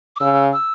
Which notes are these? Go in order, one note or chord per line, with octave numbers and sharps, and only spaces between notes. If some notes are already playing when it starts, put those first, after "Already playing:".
D6
C#3 E6
E6